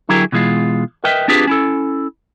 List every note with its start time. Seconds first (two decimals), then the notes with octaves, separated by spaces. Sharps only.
0.09 D3 F#3 E4 G4 G#4 A#4
0.32 B2 E3 G#3 F4
1.04 A#4 B4 D#5 E5 G5
1.28 C4 D4 F4 G4 G#4 B4
1.47 C#4 E4 A4